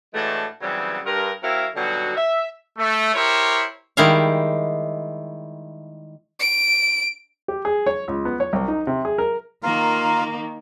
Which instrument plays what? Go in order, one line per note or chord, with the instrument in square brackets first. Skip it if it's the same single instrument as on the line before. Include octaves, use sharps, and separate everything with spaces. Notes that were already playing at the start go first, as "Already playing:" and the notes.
[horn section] A2 E3 G#3 A3 D4 F#4
C#3 E3 F#3 G3 B3 C4
G2 A#4
F#3 C4 E4 A#4 E5 F5
B2 D3 F#3 G3 D#4 F#4
E5
[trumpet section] A3
E4 G4 A#4 C5 C#5
[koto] D#3 G3 G#3 E4 E5 F5
[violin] D7
[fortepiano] G4
G#4
C#5
C#2
B3
C#5
C2
D#4
C3
G#4
A#4
[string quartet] D#3 A#3 [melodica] F4 A#4